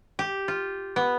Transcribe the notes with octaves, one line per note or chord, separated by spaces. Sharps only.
G4
F4
B3